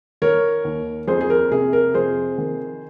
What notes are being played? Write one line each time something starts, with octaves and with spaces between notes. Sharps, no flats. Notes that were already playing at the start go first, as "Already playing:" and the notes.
D#3 A#4 C#5
D#2
F2 G#4 C5
G#4
A#4
C3 G#4
A#4
F2 G#4 C5
D#3